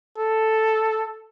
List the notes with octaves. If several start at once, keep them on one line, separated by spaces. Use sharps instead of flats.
A4